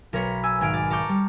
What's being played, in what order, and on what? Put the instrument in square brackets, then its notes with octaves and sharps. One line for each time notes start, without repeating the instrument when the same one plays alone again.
[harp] B1 A#4 C#5 A#5 B5
G#5 E6
G#1 G#5 F6 D7
D5
A5 A#5 C#6 D6 G6
G3